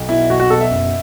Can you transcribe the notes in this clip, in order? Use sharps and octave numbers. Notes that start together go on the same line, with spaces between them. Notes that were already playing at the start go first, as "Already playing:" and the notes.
Already playing: B1
B2 E4
B1 F#4
F#4
B2 A4
E5
F#1